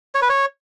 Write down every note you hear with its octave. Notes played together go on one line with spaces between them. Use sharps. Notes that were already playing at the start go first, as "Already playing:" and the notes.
C#5
B4
C#5